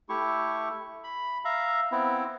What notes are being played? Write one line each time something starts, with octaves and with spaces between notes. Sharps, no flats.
A3 E4 G4 C#6
B5
E5 F5 A#5
B3 C4 E4